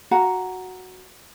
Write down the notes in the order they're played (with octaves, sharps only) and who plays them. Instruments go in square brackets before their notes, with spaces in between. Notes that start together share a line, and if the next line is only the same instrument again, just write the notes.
[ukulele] F#4 F5 F#5 A#5